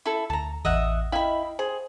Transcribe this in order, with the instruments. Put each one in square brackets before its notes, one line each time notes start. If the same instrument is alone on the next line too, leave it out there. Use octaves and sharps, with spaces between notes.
[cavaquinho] E4 A4
[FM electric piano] D2 [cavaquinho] A5 A#5
[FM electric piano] A1 E2 [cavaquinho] D#5 E5 F#5
[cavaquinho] E4 B5 [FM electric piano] D#5 F5 G5
[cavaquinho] G#4 [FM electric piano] C5